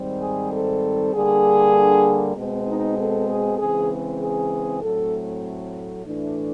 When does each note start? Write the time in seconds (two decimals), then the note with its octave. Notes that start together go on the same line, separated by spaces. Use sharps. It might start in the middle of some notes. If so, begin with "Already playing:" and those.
Already playing: G#2 D#3 G3 C4
0.21 G#4
0.51 A4
1.13 D3 G3 A#3 D4 G#4
2.36 B2 G#3 C4
2.67 D#4
2.97 A4
3.29 G#4
3.58 C#3 E3 G#3 C4 G#4
4.21 G#4
4.81 A2 F#3 A3 C4 A4
6.05 A2 E3 A3 D4